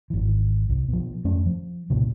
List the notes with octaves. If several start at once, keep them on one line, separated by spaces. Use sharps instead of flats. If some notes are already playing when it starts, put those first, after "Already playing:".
G#1 E3
C2
B2 F3
F2 A3 C#4
F3
C2 A#2 C#3